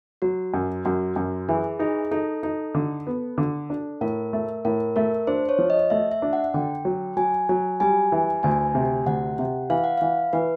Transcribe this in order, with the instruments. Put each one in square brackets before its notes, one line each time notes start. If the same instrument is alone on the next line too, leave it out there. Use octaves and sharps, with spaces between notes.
[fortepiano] F#3 [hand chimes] F#4
[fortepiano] F#2
[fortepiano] F#2 [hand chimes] F#4
[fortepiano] F#2
[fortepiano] E3 [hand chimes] G#4
[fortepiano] D#4 [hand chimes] G#4
[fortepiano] D#4 [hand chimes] A4
[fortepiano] D#4
D3
B3
D3
D4
[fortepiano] A2 [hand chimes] A#4
[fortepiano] A3
[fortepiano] A2 [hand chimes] A#4
[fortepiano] A3 [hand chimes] A#4
[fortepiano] D4 [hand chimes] C5
[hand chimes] C#5
[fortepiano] F3
[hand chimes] D#5
[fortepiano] A3 [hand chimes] E5
[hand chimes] E5
[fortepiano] D4
[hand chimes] F#5
[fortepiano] D3 [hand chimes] G5
[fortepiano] F#3
[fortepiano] F#3 [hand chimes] G#5
[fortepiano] F#3
[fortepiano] G3 [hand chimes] G#5
[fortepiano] E3
[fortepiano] D2 [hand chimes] G#5
[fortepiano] C3
[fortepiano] D2 [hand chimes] F#5
[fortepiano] C3
[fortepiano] E3 [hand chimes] F5
[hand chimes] F#5
[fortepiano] E3 [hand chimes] F5
[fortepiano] E3 [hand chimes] B4